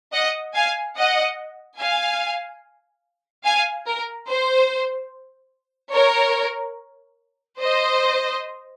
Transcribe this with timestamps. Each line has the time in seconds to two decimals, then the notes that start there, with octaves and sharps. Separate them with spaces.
0.13 D#5 F#5
0.55 F5 G#5
0.96 D#5 F#5
1.79 F5 G#5
3.45 F5 G#5
3.87 A#4
4.29 C5
5.94 A#4 C#5
7.59 C5 D#5